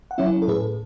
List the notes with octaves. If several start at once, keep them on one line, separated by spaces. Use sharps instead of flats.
F#5
F#3 C#4 E4 C#5 E5
A4
A2 G#4 B4